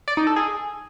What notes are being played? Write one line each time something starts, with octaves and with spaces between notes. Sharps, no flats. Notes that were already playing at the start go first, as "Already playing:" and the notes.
D5
D#4
A4
G#4